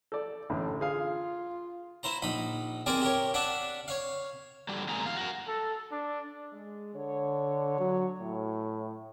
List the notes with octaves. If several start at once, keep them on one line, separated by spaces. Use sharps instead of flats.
A4 D5
A1 A2 D3
F4 G#4 F5
E4 C5 A#5
A#1 D#4 B5
C4 G#4 A#4 D5 A#5
G4 A#4 C#5
D4 E5 F#5 D6
C#5 F5
D3 F#3 G3
C3 F#3 G#3 A#3 G#4 A#5
E2 F5
F#4 A#4
A4
D4
G#3
D3 C#5
F#3
A2